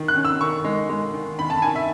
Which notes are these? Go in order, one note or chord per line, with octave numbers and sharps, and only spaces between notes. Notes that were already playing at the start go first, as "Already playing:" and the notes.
Already playing: D#3
F#6
C#4
E6
D#3 C#6
G#3
G#3
D#3
D#3 B5
A5
D#3 G#5
E5